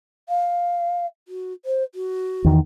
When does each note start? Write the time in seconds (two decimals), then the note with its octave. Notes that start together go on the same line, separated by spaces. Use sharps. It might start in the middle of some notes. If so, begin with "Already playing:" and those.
0.29 F5
1.28 F#4
1.65 C5
1.95 F#4
2.44 E2 D#3